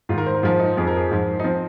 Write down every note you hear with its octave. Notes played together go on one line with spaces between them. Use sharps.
G#2 D#3 F4
A#4
C5
A#4
G#2 F3 F4
D#4
F2 F3 G#4
A#4
G#4
G#2 F3
D#4
F3 C4